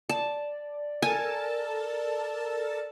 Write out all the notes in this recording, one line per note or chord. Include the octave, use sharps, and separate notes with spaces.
D5 A5
A4 A#4 G#5 A5